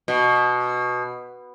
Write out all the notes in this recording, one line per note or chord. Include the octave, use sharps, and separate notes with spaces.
B2